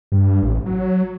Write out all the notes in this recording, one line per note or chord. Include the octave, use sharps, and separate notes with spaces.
G2
A1
F#3